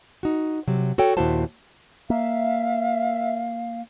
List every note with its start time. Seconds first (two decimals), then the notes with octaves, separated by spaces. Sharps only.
0.23 D#4 F#4
0.67 C3 F#3
0.98 F#4 A4 C#5 G5
1.17 D#2 A#2 E4 F#4 C5 A5
2.10 A#3 E5 F5